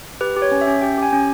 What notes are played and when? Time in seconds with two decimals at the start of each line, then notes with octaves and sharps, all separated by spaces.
0.21 G4 B4
0.36 G4
0.42 C#5
0.51 C#4
0.61 E5
0.67 C#4
0.82 G4 G5
0.98 G4 G#5
1.13 C#4